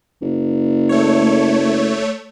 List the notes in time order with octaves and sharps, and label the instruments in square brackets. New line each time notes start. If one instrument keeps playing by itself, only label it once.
[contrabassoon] F#1
[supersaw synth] A3 C#5